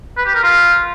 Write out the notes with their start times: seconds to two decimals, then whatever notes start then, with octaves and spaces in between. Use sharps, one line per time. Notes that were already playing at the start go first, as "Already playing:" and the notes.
0.17 B4
0.26 G4
0.34 A#4
0.43 F4